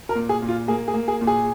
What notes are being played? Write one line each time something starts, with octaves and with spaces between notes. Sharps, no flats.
A#4
A#2
G#4
A#2
F4
A#3 G#4
G#4
A#3
G#4
A#2
G#4